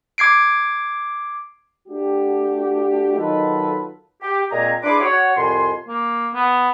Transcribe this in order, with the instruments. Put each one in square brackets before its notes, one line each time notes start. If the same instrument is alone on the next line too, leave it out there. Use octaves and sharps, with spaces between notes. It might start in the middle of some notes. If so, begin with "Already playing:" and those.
[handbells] D6 G#6 C7 D7
[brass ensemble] A3 D4 F#4 G4
D#3 F#3 D#4 F4 A4 B4
[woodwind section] G4
A#2 G#3 C4 G#5 A#5
D4 E4 G#4 B4 C6 D6
F#4 C#5
C2 F2 G#5 C6
[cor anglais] A#3
B3